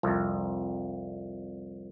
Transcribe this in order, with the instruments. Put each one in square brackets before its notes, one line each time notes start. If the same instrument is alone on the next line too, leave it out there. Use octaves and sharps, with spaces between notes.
[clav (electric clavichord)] C2 F2